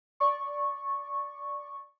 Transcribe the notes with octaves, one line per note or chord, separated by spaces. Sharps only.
D5 C#6